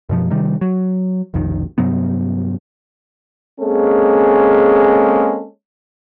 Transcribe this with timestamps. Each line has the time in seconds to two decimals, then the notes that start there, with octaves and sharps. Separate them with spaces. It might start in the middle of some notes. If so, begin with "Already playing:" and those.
0.09 F#2 B2 F3
0.30 C3 D#3 G3
0.61 F#3
1.34 F1 B1 F2 D#3
1.78 G2 C3 F#3 B3
3.61 G#3 A#3 C4 C#4 G#4 A4